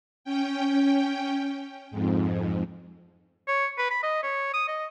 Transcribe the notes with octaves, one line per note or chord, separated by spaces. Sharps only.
C#4 G5
F2 G#2
C#5
B4
B5
D#5
C#5
D#6
D#5